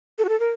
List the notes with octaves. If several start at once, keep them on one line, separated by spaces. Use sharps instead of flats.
A4
F#4
A4
A#4